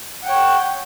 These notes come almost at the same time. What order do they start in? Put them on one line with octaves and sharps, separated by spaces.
F#5 G5 C#5